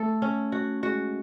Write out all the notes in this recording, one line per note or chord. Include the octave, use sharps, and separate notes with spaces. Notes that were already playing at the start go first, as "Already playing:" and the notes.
Already playing: A3 A4
C#4
F#4
G#3 F#4